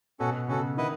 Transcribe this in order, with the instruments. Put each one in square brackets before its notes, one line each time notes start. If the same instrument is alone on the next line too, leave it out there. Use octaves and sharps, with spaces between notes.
[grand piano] B2 [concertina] C#4 F#4 A4
[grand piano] C#3 [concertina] C#4 F#4 A4
[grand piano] D#3 [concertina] E4 B4 D#5 F#5